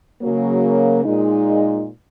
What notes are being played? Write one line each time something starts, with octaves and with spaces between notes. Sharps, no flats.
C#3 F#3 A#3
A#2 G#3 D#4